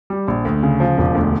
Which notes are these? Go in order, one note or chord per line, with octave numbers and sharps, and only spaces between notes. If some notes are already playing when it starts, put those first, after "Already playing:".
G3
A#1
D2
C#3
F3
E1
D2